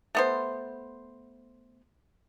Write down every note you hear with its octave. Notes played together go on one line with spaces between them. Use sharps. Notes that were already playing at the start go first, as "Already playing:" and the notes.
A3 B3 C5